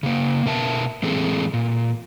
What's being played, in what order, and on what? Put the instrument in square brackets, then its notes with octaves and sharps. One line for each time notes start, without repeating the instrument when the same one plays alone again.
[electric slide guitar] C#3 A#3
B2 A#4 E5 A5
A2 E3 G#3 C4 G#4 A4
A#2